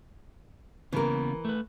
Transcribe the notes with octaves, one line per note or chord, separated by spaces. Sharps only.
C#3 E3 A#3 B3 A#4
A3 B4